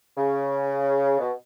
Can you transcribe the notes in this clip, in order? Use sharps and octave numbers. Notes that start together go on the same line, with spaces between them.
C#3
B2